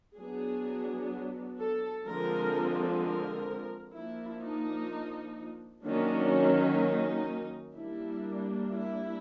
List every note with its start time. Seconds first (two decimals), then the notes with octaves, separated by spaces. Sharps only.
0.16 F#3 B3 D4 G#4
1.58 A4
2.06 D3 F3 G#3 C4 A#4
3.01 A#4
3.95 F3 A#3 D4 E4
4.43 D#4
5.85 D#3 F#3 A#3 C#4 D4
6.80 D#4
7.75 G3 A#3 D4 E4
8.69 E4